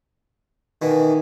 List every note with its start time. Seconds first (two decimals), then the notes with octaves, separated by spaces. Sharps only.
0.82 B2 D#3 E3